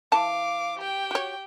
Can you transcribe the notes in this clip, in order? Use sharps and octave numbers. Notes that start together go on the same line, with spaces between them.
E3 F5 A5 D6
G4 G5
F#4 C#5